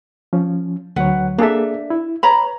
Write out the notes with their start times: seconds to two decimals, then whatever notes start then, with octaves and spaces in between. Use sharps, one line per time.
0.33 F3 C#4
0.96 D2 F#3 B4 C#5 F#5
1.38 A#3 D4 G#4 A4 E5
1.90 E4
2.23 B4 C#5 A#5 B5